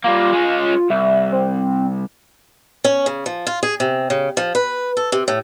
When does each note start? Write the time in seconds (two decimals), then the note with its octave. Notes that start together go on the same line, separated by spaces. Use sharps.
0.04 G3 A#3 F4
0.33 G#3 C#4
0.90 C2 E5
1.32 C4
2.84 C#4
3.06 C#3
3.26 F3
3.47 F4
3.63 G#4
3.80 C3
4.10 C#3
4.37 F3
4.55 B4
4.97 A4
5.12 C3
5.28 A2